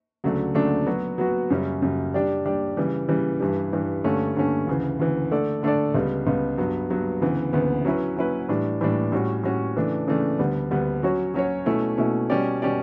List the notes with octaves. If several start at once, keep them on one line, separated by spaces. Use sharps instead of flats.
D2 C#3 F#3 A3 D4
D2 C#3 F#3 A3 D4
F#3 B3 F#4
F#3 B3 F#4
F#2 C#3 G3 C#4
F#2 C#3 G3 C#4
G3 D4 G4 D5
G3 D4 G4 D5
C#3 E3 G3
C#3 E3 G3
G2 E3 G3
G2 E3 G3
G2 D3 A3 C#4
G2 D3 A3 C#4
D2 C#3 E3
D2 C#3 E3
D3 A3 D4 A4 D5
D3 A3 D4 A4 D5
C#2 C#3 G3 B3
C#2 C#3 G3 B3
G2 F#3 B3
G2 F#3 B3
D2 C#3 E3 B3
D2 C#3 E3 B3
F#3 C#4 E4 B4
F#3 C#4 E4 B4
A2 E3 G3 D4
A2 E3 G3 D4
A2 G3 C#4 F#4
A2 G3 C#4 F#4
C#3 E3 A3 D4
C#3 E3 A3 D4
D2 D3 G3 B3
D2 D3 G3 B3
F#3 C#4 F#4 C#5
F#3 C#4 F#4 C#5
B2 A3 C#4 E4
B2 A3 C#4 E4
B2 G3 C#4 G4 D5
B2 G3 C#4 G4 D5